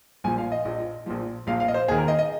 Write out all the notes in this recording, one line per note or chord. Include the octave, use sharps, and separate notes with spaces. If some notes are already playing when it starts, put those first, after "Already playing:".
A#1 A#2 F3 G#5
F5
D#5
A#1 A#2 F3
A#1 A#2 F3
A#1 A#2 F3 F5
F5
D#5
C5
D#2 D#3 G#4
A#4
D#5
D#5